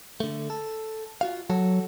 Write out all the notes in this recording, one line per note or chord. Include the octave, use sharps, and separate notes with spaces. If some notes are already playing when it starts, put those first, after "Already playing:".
D3 A3
A4
F4 F#4 F5
F#3 F#4 A4